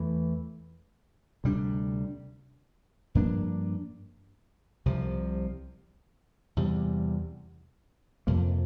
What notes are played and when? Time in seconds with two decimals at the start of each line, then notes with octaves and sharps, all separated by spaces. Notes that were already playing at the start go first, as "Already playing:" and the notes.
Already playing: E2 E3 A3
1.44 D2 C3 G3 D4
3.15 G2 F3 A#3 D4
4.86 C2 C3 F3
6.57 E2 C3 G3
8.27 F2 C3 F3 A#3